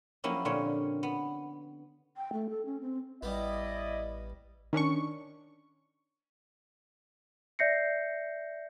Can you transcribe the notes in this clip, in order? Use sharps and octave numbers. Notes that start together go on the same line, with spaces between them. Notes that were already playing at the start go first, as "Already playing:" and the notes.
F3 F#3 A#3 C#4 E4 G4
A#2 D3 C4 C#4 C#5
B3
G5
A3
A4
C#4
C4
A1 G3 B3 E4 D5 D#5
D#3 C#4 D4 C#6
D5 E5 G6 A#6 C7 C#7